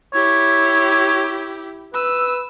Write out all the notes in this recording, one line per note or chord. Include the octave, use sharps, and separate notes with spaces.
E4 G4 C#5
B4 E6